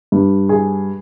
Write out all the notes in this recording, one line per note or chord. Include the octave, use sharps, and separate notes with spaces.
G2
G#4